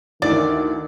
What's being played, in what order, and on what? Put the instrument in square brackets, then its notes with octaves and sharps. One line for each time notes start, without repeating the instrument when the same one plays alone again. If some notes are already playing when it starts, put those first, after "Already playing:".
[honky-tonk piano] D2 E3 [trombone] D#3 [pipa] D5